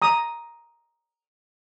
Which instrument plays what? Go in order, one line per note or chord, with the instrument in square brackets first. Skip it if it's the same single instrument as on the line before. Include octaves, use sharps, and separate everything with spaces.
[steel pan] A#5 D#6